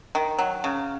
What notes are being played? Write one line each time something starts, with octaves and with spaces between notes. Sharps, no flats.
D#3
F#3
C#3